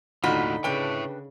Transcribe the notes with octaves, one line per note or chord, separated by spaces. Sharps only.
D#2 A2 D3 D#3 D#4 F4 F#4 B5
C#3 D4 E4 B4 C#5 G5